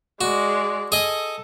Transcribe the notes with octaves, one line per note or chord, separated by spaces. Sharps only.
G#3 F#4 D5
G#4 A4 D#5